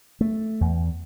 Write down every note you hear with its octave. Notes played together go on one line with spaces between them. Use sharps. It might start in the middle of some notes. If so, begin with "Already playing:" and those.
A3
E2